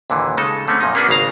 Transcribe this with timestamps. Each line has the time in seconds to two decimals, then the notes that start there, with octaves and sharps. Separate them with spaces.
0.10 D#2 A#2 D3 E3
0.37 C#3 G#3 D#4 A4
0.68 D3 A3 C4 C#4
0.80 F#2 A#2 F3 D#4
0.95 A#3 B3 C#4 D4 F#4 G#4
1.09 G#1 C#3 F5 A#5